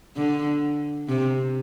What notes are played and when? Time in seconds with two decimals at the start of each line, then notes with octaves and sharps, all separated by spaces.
0.16 D3
1.09 C3